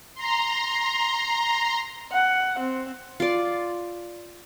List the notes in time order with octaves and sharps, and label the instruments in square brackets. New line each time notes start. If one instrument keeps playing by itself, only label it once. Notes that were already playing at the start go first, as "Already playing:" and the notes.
[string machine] A#5 C6
[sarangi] F#5
C4
[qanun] F4 D5